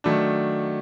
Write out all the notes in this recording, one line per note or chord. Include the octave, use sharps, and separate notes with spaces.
D#3 F#3 A3 D4